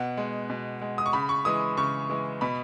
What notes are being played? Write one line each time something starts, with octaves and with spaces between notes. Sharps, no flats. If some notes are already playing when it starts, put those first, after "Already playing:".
Already playing: B2 F#5
G#3
B2
G#3
D#6
C#6
C#3 B5
C#6
E3 G#3 D#6
C#3 C#6
E3 G#3
B2 B5